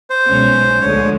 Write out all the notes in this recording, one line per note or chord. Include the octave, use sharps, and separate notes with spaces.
C5
B1 B2 G#3 C#4
D2 D3 F3 G#3 C#5